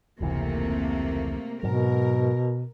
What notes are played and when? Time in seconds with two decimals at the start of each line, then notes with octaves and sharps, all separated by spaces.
0.21 F1 C#2 C3 E3 A3 A#3
1.63 G#2 B2 F#3 A#4